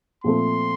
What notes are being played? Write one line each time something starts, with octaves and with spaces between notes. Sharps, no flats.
A#2 F3 A3 C4 C6